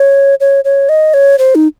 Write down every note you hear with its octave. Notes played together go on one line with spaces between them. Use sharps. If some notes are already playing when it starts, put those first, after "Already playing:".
Already playing: C#5
C#5
C#5
D#5
C#5
C5
D#4